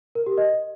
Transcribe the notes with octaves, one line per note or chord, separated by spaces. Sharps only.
A#4
G4
D#5